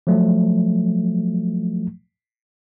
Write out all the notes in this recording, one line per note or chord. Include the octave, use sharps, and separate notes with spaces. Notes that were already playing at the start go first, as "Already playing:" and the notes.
F3 F#3 A3